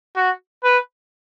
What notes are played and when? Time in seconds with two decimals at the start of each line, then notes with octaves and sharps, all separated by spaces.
0.16 F#4
0.64 B4